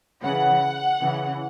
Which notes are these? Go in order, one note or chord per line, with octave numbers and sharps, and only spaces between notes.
C#3 E3 F#5
C#3 E3